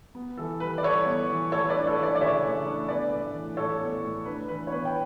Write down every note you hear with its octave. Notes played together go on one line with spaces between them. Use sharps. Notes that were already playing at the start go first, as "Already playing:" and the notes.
B3
E3 A4
G3 B4
D5
E3 A4 C#5
B3
E3
A3 A4 C#5
B4 D5
D4
A4 C#5
E3 B4 D5
D5
C#3 C#5 E5
A3
D4
B3 B4 D5
A2
E3
A2 A4 C#5
B3
A2
D4 B4
E3 B4
C#5
B3 B4
G5